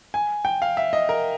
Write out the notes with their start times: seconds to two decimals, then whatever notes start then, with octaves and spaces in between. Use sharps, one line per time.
0.14 G#5
0.45 G5
0.62 F5
0.77 E5
0.93 D#5
1.09 A#4